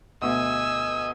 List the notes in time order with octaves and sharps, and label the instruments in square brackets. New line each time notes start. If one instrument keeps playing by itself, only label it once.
[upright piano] D2 B2 [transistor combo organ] D#5 [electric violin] G#5 E6